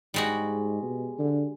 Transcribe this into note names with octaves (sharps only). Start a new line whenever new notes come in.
G#2 G3 G#3 F#4
B2
D3